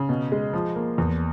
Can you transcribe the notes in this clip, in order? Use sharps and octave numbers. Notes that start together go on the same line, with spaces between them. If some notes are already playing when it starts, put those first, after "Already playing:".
Already playing: C#3
B2
G#3
F3
A#3
E2